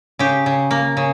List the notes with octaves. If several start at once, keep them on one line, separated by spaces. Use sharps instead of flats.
C#3 G4
C#3
A#3
C#3